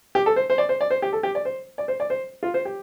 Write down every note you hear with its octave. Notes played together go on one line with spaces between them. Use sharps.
G4
A4
C5
C5
D5
C5
D5
C5
G4
A4
G4
D5
C5
D5
C5
D5
C5
F4
C5
G4